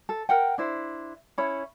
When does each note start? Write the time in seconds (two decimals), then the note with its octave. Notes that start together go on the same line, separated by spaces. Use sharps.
0.09 A4
0.29 A#4 F#5 G5
0.58 D4 E4 C5
1.38 C#4 E4 C#5 B5